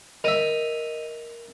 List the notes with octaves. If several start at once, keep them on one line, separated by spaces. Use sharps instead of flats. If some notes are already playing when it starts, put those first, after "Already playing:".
A#4 D#5 E5 D#7